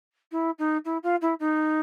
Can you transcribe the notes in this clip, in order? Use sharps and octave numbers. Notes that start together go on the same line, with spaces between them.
E4
D#4
E4
F4
E4
D#4